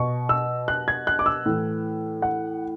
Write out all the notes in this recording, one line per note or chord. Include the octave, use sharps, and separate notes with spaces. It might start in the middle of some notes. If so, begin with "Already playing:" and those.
Already playing: B2 C#6
E6
F#6
G#6
F#6
D6
E6
A2 E3
F#5